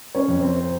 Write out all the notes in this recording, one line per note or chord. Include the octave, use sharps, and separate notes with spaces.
C#4 C#5
F2
C4 C5
C5